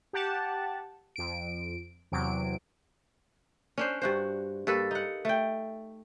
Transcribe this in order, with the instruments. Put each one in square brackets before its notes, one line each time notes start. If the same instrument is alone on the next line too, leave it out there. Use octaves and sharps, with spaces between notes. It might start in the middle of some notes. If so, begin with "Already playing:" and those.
[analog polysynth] G4 F#5 A5
F2 D7
E2 C3 F#3 D7
[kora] C#4 D4 C5
G2 F#4 C5
G2 A#3 A4 B4
D#4 F#5
A3 G5